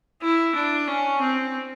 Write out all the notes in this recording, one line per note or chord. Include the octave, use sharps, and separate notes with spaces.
E4
D4
C#4
C4